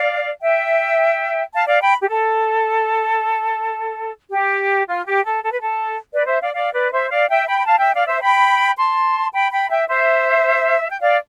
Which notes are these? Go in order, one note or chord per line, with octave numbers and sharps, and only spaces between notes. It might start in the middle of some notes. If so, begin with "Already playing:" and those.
Already playing: D5 F5
E5 G5
F5 A5
D5 F5
G5 B5
G4
A4
G4
F4
G4
A4
A4
B4
A4
B4 D5
C5 E5
D5 F5
D5 F5
B4 D5
C5 E5
D5 F5
E5 G5
G5 B5
B5
F5 A5
E5 G5
D5 F5
C5 E5
G5 B5
A5 C6
G5 B5
G5 B5
E5 G5
C5 E5
G5
D5 F5